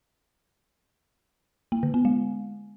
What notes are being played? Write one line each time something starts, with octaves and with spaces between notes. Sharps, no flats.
A#3
D3
B3
G#3